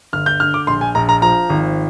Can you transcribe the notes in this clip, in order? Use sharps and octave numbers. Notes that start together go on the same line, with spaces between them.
G1 F6
G6
D3 F6
D6
A#1 C6
G#5
A#1 A#5
A#5
F3 A#5
G#1